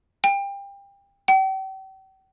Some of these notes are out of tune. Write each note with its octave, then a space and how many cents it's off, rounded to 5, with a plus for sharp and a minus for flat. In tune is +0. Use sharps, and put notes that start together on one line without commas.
G5 +25
G5 -40